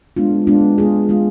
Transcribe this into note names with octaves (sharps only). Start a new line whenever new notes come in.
G#3 B3 D4 F4
G#3 B3 D4 F4
G#3 B3 F4 G#4
G#3 B3 F4 G#4